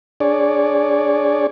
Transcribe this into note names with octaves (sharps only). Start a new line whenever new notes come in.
D4 G#4 C#5 D5